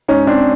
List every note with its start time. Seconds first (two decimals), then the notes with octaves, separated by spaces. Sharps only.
0.08 G#2 C#4 D#4
0.27 C4 D4